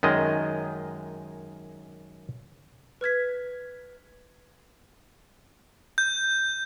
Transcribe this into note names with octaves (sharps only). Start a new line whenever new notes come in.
F#2 D#3 G#3 D#5
B4 F6 G#6 B6
G6